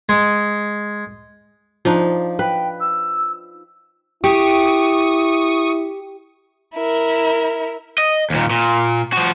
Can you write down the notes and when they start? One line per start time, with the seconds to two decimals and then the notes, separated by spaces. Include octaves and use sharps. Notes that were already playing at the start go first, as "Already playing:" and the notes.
0.09 G#3
1.85 F3 D4 D#4
2.39 B4 G5
2.80 E6
4.24 E4 G4 C#6 D#6
6.75 E4 A#4
7.98 D#5
8.30 D#2 A#2
8.51 A#2
9.13 F3 F#4